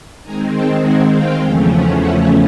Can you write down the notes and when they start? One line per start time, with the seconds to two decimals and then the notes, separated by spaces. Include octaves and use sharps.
0.24 D#3 G#3 C4 G#5 A#5
0.53 G5 A5
0.82 F#5 G#5
1.12 F5 G5
1.41 E2 C#3 F3 A3 C#4
1.71 E5 F#5
2.00 E5 F#5